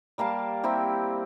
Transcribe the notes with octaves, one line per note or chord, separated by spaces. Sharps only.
G3 A#3 F5 A5
A#3 C4 E4 G4